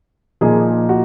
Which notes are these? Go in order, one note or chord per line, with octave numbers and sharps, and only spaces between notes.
A#2 F3 A#3 D#4 G#4
F#4